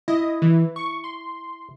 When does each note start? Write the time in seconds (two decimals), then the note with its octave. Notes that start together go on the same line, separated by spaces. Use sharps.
0.08 E4 D#5
0.42 E3
0.76 C#6
1.04 C6